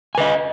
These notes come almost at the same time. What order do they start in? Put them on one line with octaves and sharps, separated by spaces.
G#5 B4 D#5